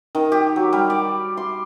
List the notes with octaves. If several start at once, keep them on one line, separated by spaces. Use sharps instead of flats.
D#3
G4
F#3
G3
D5
C6